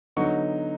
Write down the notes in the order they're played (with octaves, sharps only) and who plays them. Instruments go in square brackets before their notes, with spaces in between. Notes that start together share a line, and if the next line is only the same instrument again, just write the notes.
[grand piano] D3 F#3 B3 D#4 C#6